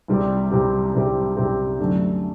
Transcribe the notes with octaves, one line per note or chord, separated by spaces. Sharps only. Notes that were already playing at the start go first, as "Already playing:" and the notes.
C2 C3 G3 C4 G4
C2 C3 G3 C4 G4
C2 C3 G3 C4 G4
C2 C3 G3 C4 G4
F#2 D3 A3 D4